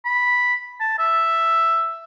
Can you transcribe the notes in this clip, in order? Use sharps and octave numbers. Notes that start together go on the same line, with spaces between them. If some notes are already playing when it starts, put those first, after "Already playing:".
B5
A5
E5